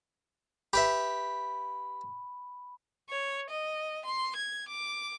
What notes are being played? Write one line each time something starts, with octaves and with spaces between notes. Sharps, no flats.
G4 B4 E5 B5
C#5
D#5
C6
G#6
D6